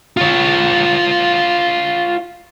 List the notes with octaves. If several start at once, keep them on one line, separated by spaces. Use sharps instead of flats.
F4 C#5